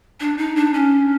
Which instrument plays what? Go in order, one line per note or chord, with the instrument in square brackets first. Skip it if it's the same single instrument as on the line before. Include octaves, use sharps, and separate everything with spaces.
[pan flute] D4
D#4
D4
C#4